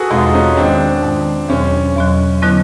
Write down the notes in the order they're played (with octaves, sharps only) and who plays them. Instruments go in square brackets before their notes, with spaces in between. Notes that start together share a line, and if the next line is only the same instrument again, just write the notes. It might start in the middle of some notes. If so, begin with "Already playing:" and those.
Already playing: [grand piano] F#4 G#4 A4 B4
[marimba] E2 B2 G#3 C4 [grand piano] D#4 F4
[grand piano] C#4 D#4
[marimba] G#2 D#3 G#3 [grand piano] C4 D4
[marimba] G#2 D#3 G#3
[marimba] E2 B2 F#3 [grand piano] C#4
[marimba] E2 B2 F#3
D3 F#3 B3 E4